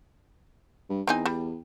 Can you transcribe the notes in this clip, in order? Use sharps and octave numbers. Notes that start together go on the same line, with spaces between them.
G2
E2 C4 D#4 G#5
G3